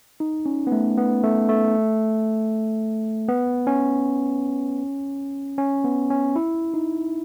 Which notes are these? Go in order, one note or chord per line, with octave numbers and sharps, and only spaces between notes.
D#4
C#4
B3
A3
B3
A3
A3
B3
C#4
C#4
B3
C#4
E4
D#4